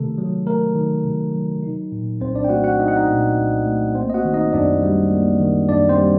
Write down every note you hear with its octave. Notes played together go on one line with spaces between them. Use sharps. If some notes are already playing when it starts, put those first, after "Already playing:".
Already playing: C3 D#3 A3 A4
F#3
A3 A#4
D#3
C3
F#3
D#4
A#2
C2 C4 C5
D4 D5
G5
A3 F#4 F#5
F#4 F#5
D#4 D#5
F#5
D#4 D#5
A#2
C2
A3
A#3 C4 C5
D#5
F#4 F#5
D#3
D#4 D#5
F#2 D4 D5
G3
A#3
D#3
F#2 D4 D5
C4 C5
G3